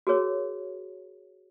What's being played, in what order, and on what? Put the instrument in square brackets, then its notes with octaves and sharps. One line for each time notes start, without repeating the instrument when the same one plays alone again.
[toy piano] F#4 G#4 A#4 C#5